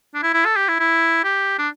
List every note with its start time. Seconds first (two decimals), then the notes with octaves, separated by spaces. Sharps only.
0.14 D4
0.22 E4
0.33 E4
0.45 A4
0.56 G4
0.68 E4
0.80 E4
1.24 G4
1.58 D4